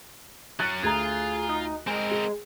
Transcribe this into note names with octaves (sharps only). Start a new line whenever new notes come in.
F#3 C#4 F#6 A6
D2 F4 G#4 A#5
D#4
G#3 C4 A#4
G#4